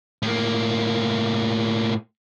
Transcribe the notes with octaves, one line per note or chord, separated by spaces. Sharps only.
A2 A#3